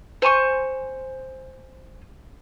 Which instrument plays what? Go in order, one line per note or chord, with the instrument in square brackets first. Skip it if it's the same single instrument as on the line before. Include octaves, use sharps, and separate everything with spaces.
[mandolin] C5 G#5 C6 C#6